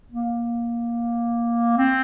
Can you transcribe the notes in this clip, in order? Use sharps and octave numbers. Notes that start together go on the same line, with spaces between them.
A#3
C4